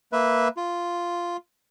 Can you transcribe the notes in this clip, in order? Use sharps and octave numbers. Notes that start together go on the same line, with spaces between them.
A#3 B4 E5
F4